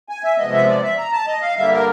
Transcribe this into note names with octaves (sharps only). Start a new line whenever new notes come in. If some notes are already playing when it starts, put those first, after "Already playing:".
G#5
E5
C3 F3 G#3 B3 D#5
E5
D5
E5
A#5
A5
D#5
F5
G2 D3 G3 A#3 E5
A#4